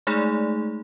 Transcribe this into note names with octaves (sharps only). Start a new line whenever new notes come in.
G#3 A3 D#4 G#4 D5